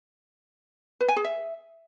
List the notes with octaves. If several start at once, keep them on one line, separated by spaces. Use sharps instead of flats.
B4
G#5
G#4
E5